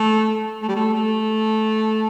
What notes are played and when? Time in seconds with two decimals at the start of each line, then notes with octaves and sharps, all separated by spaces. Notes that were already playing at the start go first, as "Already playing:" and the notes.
Already playing: A3
0.62 A3
0.68 G3
0.76 A3
0.93 A3